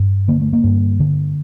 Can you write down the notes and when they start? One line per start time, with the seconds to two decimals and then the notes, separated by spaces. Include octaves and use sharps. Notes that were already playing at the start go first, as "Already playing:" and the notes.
Already playing: G2
0.28 D3 A#3
0.41 A3
0.53 A#3
0.64 G2
1.00 D3